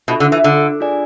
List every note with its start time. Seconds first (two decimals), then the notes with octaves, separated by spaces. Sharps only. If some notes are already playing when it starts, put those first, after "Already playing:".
0.08 B2 D4 F4 A4 E5
0.20 D3
0.32 E3
0.44 D3
0.80 D4 F4 G#4 D5 G#5